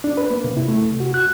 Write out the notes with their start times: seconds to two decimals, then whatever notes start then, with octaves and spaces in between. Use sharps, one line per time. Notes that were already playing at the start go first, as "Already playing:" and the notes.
0.04 D4
0.17 B4
0.31 A#3
0.44 C3
0.57 E4
0.68 A3
0.82 C3
1.00 F#4
1.14 F#6